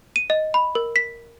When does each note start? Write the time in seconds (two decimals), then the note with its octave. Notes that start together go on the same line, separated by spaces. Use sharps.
0.16 D#7
0.30 D#5
0.54 B5
0.75 A#4
0.96 B6